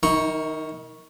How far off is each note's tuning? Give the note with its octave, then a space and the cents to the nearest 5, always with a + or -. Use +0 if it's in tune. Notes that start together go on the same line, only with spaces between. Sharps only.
D#3 -5 D#4 +45 C#6 +0